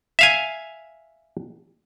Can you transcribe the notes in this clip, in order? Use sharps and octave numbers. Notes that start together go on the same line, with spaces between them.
E5 F5 G#5